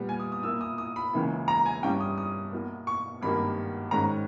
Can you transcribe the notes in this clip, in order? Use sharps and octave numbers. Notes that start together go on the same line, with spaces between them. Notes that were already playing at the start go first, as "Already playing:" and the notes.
Already playing: A#2 G3 B3
G#5
D#6
D#6
A#2 A#3 E4 E6
D#6
D#6
B5
C#2 C#3 E3 A#3 E4
A#5
G#5
G2 G3 C#4 E4 G5
D#6
D#6
B1 B2 A#3 E4
C#6
G#1 G2 D#3 G3 A#3 B5
G#2 D#3 G#3 C#4 A#5